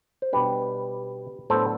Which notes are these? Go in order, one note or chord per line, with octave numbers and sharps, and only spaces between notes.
C5
B2 G3 D4 G4 B4
A2 F#3 B3 D4 A4 C5